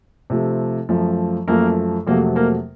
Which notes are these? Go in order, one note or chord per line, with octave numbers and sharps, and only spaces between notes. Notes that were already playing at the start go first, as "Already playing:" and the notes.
C3 F3 A3
F#2 F3 A3
F#2 F3 A3 A#3 A#4
F2 C3 F#3 A3 A#3 A#4
A#3 A#4